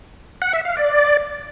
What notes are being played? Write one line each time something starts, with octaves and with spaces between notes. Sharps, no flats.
F#5
E5
F5
D5